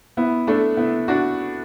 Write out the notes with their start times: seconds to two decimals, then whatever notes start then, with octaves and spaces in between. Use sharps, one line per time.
0.17 B3 E4
0.47 A3 D4
0.77 B3 E4
1.08 D4 F#4